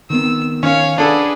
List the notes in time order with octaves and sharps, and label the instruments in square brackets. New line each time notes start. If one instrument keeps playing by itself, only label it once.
[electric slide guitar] D#3 B3 C4 [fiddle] E6
[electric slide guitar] D#3 [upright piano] C#4 [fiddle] C#5 F5
[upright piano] D4 A4 [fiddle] G#4 B4 [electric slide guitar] D5 F5 F#5